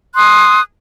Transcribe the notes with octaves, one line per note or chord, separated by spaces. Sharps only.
C6 D#6 F#6